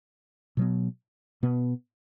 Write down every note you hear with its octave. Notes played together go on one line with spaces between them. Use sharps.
B2 F#3 B3
B2 B3